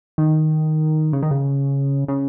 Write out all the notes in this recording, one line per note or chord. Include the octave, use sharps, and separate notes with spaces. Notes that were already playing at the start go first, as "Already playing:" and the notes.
D#3
C#3
D#3
C#3
C#3